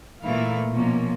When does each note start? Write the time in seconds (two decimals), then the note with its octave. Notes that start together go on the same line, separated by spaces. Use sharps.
0.23 A#2 E3 A3 A#3 E4 F5
0.73 B2 F3 A#3 C#4